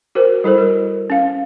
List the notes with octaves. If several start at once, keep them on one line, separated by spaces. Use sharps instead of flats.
F#4 A#4 C5
G3 E4 A4 C5
A#4
C#4 F5